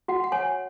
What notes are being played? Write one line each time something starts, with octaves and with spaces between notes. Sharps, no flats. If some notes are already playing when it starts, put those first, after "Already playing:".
F#4 F#5
F#5
C#5 G#5